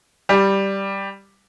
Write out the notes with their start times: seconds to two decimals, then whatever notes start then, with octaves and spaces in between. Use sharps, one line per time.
0.29 G3